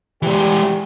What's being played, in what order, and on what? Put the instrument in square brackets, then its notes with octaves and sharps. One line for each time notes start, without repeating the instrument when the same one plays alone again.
[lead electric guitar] E3 G#3 [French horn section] G3 G4